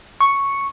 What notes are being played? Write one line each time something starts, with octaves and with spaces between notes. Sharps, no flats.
C#6